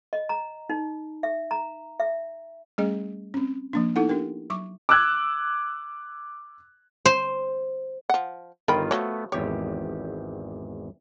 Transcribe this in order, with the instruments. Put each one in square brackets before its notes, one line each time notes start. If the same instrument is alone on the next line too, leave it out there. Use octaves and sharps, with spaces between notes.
[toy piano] D#5
A#5
D#4
E5
A#5
E5
[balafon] G3 A3 C#4 G#4 D#5
C4 C#4
F3 A#3 D4
B3 D#4 E4 A4 F#5
D4 G4 A#4 G5
F#3 C#6 D6
[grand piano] D6 E6 F#6 G#6
[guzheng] C5
[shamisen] F3 F#5
[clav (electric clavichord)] G1 D#3 F4 [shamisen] A#4 G5 B5
[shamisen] F3 F#4 C#5 [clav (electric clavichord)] A3 B3
[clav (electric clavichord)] G#1 E2 G4 [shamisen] C#5